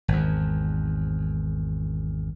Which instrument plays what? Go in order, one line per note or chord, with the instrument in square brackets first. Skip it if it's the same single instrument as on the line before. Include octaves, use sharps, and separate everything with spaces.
[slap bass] G#1 E2